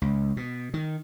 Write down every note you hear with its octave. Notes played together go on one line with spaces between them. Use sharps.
C#2
B2
D#3